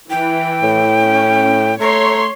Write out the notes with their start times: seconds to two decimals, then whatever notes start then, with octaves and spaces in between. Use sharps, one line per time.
0.10 E3 G5
0.63 A2
1.00 C#4
1.80 A3 C#5 A#5 C6